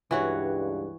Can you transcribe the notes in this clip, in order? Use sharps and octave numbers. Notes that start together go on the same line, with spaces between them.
C#2 G2 E3 F#4 C#5